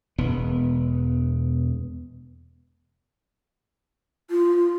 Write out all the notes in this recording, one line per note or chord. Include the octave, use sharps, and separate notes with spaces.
E1 B3
F4